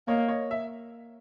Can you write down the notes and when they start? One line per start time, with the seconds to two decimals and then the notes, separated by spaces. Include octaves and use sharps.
0.08 A#3 C#5 D#5
0.28 C#5 D#5
0.51 E5